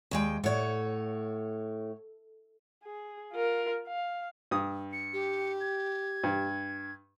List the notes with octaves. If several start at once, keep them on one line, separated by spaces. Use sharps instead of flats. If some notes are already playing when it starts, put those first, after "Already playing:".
D#2 G#3 G5
A2 C#5 F#5
G#4
F4 A#4
F5
G2 D#6
C#7
G4
G#6
G2